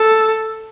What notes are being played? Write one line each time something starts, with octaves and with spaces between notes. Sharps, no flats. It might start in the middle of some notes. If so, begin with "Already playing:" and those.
Already playing: A4